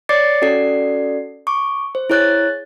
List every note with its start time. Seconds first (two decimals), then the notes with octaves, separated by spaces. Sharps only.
0.09 C#5 D5 D6 A6 C7 C#7
0.42 C#4 F#4 A4 D5 C7
1.47 C#6 D6
1.95 C5
2.10 E4 G#4 C#5 F#6 G#6 A6